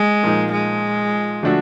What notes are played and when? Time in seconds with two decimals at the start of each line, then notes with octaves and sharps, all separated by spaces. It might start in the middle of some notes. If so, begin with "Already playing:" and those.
Already playing: G#3
0.23 A#2 F3 A#3 D#4
0.52 G#3
1.43 D3 F3 A3 D4 F#4